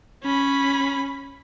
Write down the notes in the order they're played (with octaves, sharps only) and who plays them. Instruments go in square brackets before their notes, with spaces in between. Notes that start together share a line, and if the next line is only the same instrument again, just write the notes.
[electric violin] C#4 B5